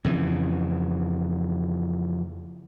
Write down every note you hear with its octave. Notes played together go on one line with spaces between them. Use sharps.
F2 C#3 E3